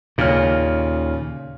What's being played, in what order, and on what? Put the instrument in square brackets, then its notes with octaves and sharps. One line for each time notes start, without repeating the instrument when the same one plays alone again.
[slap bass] D#2 A#2 [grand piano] C#3 C#4 F6